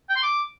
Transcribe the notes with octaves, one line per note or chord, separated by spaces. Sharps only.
G5
C6
D6